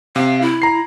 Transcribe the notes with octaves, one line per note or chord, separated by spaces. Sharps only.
C3 F5
E4
A#5 C7